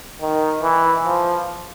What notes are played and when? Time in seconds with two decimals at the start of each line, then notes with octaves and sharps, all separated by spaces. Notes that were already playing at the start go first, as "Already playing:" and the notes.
0.21 D#3
0.63 E3
1.05 F3